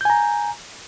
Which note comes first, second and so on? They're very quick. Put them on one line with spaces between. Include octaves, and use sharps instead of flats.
G6 G#5 A#5